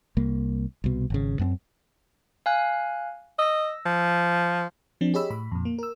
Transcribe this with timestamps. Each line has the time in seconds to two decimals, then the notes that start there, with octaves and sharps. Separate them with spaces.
0.17 C2 A#3
0.84 C2 B2
1.10 G#1 C#3
1.39 F#2 B3 C4
2.46 F5 G#5 F#6
3.39 D#5 E6 A#6
3.86 F3
5.01 F3 C4 D4
5.14 G4 G#4 C#5 D#5 B5 E6
5.30 A2 B5
5.52 F2 A#2
5.65 A#3
5.79 A#4 E6